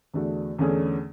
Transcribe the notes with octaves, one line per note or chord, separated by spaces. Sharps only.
E2 D3 A3 D4 F#4
E2 D3 A3 C#4 G#4